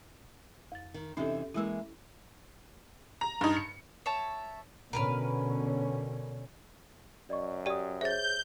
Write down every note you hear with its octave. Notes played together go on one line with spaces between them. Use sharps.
F2 A6
D#3
C3 E3 C#4 D#4 G4 A4
E3 G#3 A#3 E4 E6
A#5
G2 D#4
C#7
C#5 E5 A5
B2 D3 C#4 A#4 B4 F6
F#2 D5 D#5 C#6
G4 D5 G5 D#6
G#4 C5 C#5 E5 G6 A6